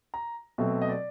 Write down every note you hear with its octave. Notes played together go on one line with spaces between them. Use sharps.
A#5
B2 F#3 A3 C4 E5
D#5
D5